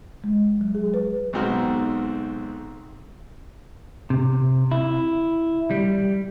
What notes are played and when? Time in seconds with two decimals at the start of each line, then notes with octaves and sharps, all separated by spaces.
0.24 G#3
0.61 F#3
0.75 G#4
0.94 B4
1.33 B1 G#2 C4 F#4 F6
4.10 C3
4.71 E4
5.71 G3